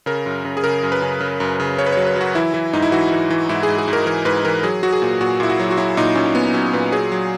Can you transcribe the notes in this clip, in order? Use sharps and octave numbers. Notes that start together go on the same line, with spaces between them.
C#3 A#4
F#2
C#3
G#4
C#3 A#4
F#2
B4
C#3
C#3
F#2
C#3
C#3 C#5
B4
F#3 C#5
B4
F#3 F#4
E3 E4
E3 E4
G#2 D#4
E4
E3 F#4
E3
E3
G#2 E4
G#4
G#2
G#4
G#2
A#4
E3 A#4
G#2 B4
E3 A#4
F#3 G#4
F#3 F#4
G#4
A#2
A#2 F#4
A#2 E4
F#4
F#3
F#4
F#3 E4
A#2 D#4
A#2 C#4
A#2 B3
F#3 C#4
A#2 B4
F#3 G#4
F#3